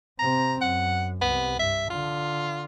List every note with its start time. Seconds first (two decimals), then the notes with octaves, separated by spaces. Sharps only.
0.19 C3 C4 A#5
0.61 F#2 F#5
1.22 C2 C3 B3
1.59 G2 E5
1.90 D3 F4